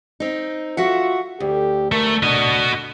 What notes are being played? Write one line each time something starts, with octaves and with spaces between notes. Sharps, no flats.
C4 D#4
F4 F#4 E5 F#5
D2 G4
A3 A#4
D4 F#4 D#5